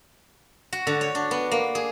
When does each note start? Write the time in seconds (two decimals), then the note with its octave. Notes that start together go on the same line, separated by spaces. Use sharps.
0.73 F#4
0.87 D3
1.01 C#5
1.15 D4
1.31 B3
1.51 A#3
1.75 G#4